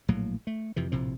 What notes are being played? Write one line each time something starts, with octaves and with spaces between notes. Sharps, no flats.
A#1 A2 F#3 A#3
A3
F2 C3 E3
A#1 A2 C3 F3